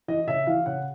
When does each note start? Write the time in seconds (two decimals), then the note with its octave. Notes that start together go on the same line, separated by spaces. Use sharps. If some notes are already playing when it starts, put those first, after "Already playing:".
0.08 E3 D#5
0.28 C#3 E5
0.47 E3 F5
0.66 C#3 F#5